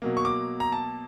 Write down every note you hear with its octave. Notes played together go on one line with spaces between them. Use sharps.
B2 F#3 A#3
C#6
D6
A#5
A5